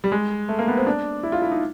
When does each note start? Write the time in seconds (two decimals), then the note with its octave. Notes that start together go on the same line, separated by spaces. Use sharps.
0.04 G3
0.12 G#3
0.49 A3
0.59 A#3
0.68 B3
0.77 C4
0.87 D4
1.23 E4
1.32 F4
1.42 E4
1.52 D#4